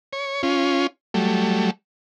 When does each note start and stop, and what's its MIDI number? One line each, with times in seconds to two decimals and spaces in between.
0.13 0.42 73
0.43 0.87 61
0.43 0.87 65
1.14 1.71 54
1.14 1.71 55
1.14 1.71 57